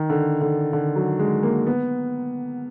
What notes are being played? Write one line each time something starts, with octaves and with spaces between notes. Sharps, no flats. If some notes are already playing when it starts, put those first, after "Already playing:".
Already playing: D#3
D3
D3
D3
F#3
G#3
A#3
B3